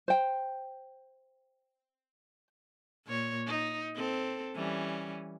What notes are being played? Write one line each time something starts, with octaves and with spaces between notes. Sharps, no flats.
C5 G5
A#2 C#5
D#4
C4 A4
E3 G3 C#4